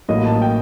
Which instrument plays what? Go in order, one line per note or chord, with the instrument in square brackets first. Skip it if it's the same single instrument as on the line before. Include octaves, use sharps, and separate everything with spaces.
[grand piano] A1 A2 F#3 A#3 [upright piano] D#5
[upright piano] A5
G5